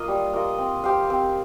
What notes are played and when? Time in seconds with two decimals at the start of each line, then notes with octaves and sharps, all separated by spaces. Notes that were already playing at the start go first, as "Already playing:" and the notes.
Already playing: A#3 F4 D#5
0.08 G3
0.33 A#3 F4 D#5
0.58 C4
0.84 G4 C5 F5
1.10 C4